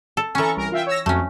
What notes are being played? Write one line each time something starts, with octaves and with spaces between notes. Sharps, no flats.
A4
E3 C#4 A4 A#5 C#6
C2 A#4
F4 E5 G5
C#5 E6 A#6
F2 F#3 A3 C#4